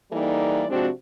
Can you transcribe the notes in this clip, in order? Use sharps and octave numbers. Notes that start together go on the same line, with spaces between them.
E3 G3 A#3 D#4 A4 D5
C3 F3 G#3 C4 D4 F#4